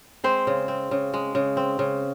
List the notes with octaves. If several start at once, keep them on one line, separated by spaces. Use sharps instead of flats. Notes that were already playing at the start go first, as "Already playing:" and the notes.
G#3 C4 C5
C#3
C4
C#3
G#3
C#3
C4
C#3